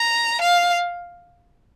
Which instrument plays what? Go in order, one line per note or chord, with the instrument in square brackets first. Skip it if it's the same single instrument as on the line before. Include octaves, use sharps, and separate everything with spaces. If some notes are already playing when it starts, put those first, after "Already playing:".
Already playing: [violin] A#5
F5